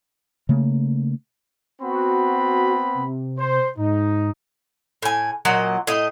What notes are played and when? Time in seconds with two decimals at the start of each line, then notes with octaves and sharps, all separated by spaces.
0.49 C#3 A3 A#3
1.82 B3 C4 F#4 B5
2.94 C3
3.38 C5
3.77 G#2 D#4
5.02 A2 G#5
5.45 A#2 F#3 D#5
5.87 A2 D#5